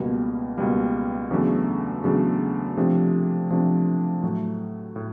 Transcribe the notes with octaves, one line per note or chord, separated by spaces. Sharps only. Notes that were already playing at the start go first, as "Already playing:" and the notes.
Already playing: C#2 B2 G3 A#3
C#2 B2 G3 A#3
E2 C#3 F#3 A3 D4
E2 C#3 F#3 A3 D4
C3 F3 A3 D4
C3 F3 A3 D4
A2 F#3 A3
A2